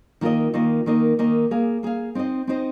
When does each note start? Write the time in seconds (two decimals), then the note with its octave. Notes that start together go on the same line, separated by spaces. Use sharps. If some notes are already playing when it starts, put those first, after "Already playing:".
0.21 D#3 A#3 F4 A#4 D#5
0.54 D#3 A#3 F4 A#4 D#5
0.86 D#3 A#3 D#4 A#4 D#5
1.19 D#3 A#3 D#4 A#4 D#5
1.51 A#3 G#4 F5
1.83 A#3 G#4 F5
2.15 C4 D#4 C5 D#5
2.47 C4 D#4 C5 D#5